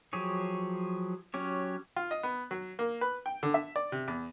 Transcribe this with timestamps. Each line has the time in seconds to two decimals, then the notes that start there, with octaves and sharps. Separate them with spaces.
0.13 F3 F#3 G4 G#4 C#5
1.34 F#3 C#4 G4 C#5
1.96 F4
2.11 D#5
2.23 B3
2.51 F#3
2.79 A#3
3.01 B4
3.26 G5
3.43 D3
3.54 E5
3.76 D5
3.92 C3
4.08 E2